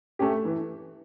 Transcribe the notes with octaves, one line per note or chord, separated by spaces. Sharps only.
A3 C#4 G4
E3